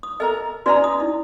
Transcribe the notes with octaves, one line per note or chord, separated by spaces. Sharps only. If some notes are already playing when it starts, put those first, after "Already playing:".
D#6
A4 A#4 D#5 A#5
C#4 F#4 B4 D5 D#5 A#5
D#6
D#4 E4